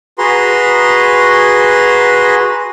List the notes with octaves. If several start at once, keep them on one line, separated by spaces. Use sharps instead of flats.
F#4 G#4 B4 A#5 C6